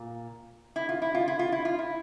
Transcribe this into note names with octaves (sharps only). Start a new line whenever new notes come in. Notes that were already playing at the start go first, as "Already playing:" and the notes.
Already playing: A#2
E4
F4
E4
F4
E4
F4
E4
F4
E4